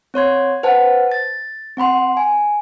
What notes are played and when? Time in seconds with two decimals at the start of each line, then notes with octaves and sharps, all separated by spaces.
0.14 C4 C#5 C6 G#6
0.63 B4 C5 F#5 A5
1.12 A6
1.77 C4 F#5 B5 C6
2.17 G#5